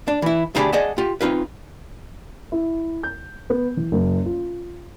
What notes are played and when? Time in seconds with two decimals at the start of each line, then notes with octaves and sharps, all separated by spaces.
0.08 D4
0.22 E3 E4
0.55 D2 A#3 D4 G4 G#4 B5
0.73 G#4 D5 D#5 F#5 A5
0.98 F4 G4
1.21 C4 D#4 F4 B4
2.52 E4
3.03 G6
3.50 B3
3.77 E3
3.92 F#1
4.25 F4